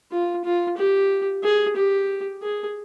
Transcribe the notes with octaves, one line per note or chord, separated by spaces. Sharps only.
F4
F4
G4
G#4
G4
G#4